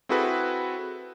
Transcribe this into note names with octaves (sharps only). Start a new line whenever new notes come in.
C4 E4 F#4 G#4 A4 B4